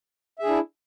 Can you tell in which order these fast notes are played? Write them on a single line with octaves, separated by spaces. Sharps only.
E5 G#4 D4 E4